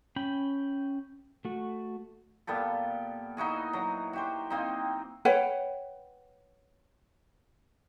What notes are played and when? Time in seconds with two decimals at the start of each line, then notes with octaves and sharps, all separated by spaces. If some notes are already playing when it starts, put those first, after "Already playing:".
0.16 C#4 G5 B5
1.45 A3 F#4
2.47 A#2 B3 G4 A4
3.37 D#4 E4 F#4 G#4
3.73 F#3 A#5
4.13 F#4 G4 C5
4.50 A#3 C4 D#4
5.25 B4 C#5 F#5 G5